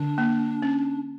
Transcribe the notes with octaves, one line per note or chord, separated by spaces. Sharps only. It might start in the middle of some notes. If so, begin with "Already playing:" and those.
Already playing: D3 D4
A#3
C#4